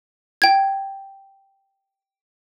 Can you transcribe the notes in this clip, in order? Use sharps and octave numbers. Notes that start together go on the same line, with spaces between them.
G5 G#6